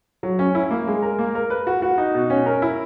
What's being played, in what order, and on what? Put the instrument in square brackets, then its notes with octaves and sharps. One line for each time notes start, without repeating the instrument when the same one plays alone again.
[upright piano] F#3
C#4
E4
A#3
G#3
A#4
A#3
A#4
B4
F#4
F#4
D#4
B2
C#4
A#4
E4